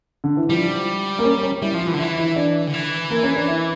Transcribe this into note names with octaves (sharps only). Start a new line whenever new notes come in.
D3
E3
F3 G3
A#3
C#4
C#4
G3 E4
F3
F4
E3
D3
E4
E3
E4
D4
D3
E3
A#3
C#4
D4
E4